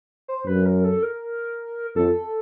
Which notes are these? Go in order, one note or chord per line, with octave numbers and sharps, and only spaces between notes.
C5
F#2 B4
A#4
A4
A#4
F2 A4